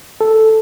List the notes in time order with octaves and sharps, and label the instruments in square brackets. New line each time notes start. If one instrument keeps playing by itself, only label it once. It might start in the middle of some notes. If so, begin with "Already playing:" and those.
[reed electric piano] A4